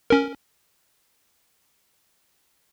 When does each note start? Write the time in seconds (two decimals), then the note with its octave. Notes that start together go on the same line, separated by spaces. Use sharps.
0.10 C#4 A#4